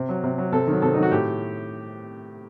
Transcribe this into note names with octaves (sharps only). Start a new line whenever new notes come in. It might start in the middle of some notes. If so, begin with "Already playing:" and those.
Already playing: C3
F#3
C3
F#3
C3 A4
D#3 F#3
C3 A4
D#3 F#3 D#4
F#4
A2 G4